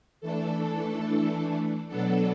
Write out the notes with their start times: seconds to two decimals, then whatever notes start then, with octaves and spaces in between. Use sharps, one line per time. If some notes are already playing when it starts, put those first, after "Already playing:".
0.21 E3 A3 D4 A4
1.88 B2 F#3 B3 D4 A4